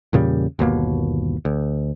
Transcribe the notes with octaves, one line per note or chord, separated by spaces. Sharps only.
E2 A#2 C#3 G3
G1 D#2 B2 A#3
D2